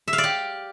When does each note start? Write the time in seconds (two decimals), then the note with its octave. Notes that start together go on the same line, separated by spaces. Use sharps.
0.08 E5
0.13 F5
0.18 D5
0.24 G4